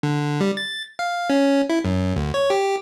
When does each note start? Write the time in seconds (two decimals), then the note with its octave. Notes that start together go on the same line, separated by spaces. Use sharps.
0.03 D3
0.40 G3
0.57 A6
0.99 F5
1.30 C#4
1.69 E4
1.85 F#2
2.16 D2
2.34 C#5
2.50 G4